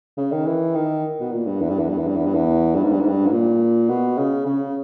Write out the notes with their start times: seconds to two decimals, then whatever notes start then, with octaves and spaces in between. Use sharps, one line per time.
0.17 C#3
0.32 D#3
0.46 E3
0.75 D#3
1.20 B2
1.32 A#2
1.46 G2
1.61 E2
1.70 G2
1.79 E2
1.89 G2
1.98 E2
2.08 G2
2.16 E2
2.25 G2
2.35 E2
2.75 G2
2.83 G#2
2.92 G2
3.00 G#2
3.08 G2
3.26 G#2
3.32 A#2
3.89 B2
4.18 C#3
4.46 C#3